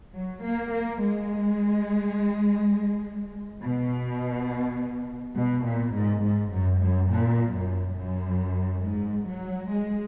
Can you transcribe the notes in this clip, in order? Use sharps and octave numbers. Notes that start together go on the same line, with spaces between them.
F#3
A#3
A#3
G#3
B2
B2
A#2
G#2
G#2
F#2
F#2
A#2
F#2
F#2
G#2
F#3
G#3